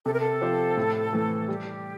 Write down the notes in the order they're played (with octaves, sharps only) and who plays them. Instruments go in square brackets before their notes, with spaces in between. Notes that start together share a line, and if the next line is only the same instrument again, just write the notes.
[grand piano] C3 [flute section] A4
[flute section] A#4
A4
[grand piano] F3 C4 G4 C5
A2
E3 A3
[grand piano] G3 [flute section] G4